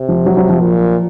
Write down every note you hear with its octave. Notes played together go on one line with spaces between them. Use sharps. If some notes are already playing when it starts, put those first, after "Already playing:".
Already playing: C3
F3
F#3
F#3
F3
A#2